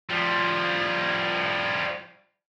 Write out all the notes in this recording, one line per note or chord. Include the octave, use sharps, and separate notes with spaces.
F3 G3